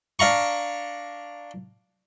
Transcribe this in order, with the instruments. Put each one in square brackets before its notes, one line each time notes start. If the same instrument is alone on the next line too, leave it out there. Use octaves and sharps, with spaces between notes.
[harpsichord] D4 F5 A#5 C#6